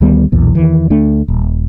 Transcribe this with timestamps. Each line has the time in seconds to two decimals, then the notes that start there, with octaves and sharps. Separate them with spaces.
0.01 D2 D#3 G3 B3
0.32 B1 E2 A#2
0.55 E2 D#3 E3
0.90 D2 A3 D4
1.28 D#1